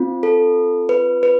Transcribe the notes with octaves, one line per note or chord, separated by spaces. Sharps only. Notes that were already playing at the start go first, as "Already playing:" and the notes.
Already playing: C4 F4
A4
B4
B4